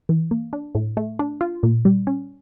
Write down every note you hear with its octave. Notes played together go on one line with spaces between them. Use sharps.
E3
A#3
D4
A2
A3
D4
F4
A#2
G3
C#4